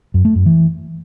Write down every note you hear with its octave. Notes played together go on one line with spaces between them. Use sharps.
F#2
A3
F#2
E3